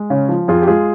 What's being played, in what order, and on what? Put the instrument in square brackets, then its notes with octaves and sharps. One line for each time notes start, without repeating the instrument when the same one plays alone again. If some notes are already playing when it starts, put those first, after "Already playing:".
Already playing: [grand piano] G#3
C#3 C#4
F3
F2 F4 G#4
G4
G#3 F4 G#4